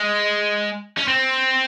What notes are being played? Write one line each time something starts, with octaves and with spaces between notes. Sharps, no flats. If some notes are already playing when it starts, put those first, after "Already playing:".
Already playing: G#3
C#4
C4